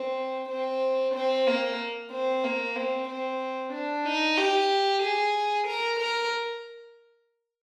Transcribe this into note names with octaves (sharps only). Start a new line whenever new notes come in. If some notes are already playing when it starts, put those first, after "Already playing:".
Already playing: C4
C4
C4
A#3
C4
A#3
C4
C4
D4
D#4
G4
G#4
A#4
A#4